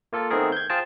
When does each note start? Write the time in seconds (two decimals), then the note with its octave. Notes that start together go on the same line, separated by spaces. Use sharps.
0.13 A#3 F4 A4
0.30 D#3 A3 B3 C4 G#4 A#4
0.52 G6 G#6
0.70 F4 G#4 C5 G5 A5